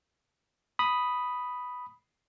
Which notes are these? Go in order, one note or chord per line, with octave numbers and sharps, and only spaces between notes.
B5 D#6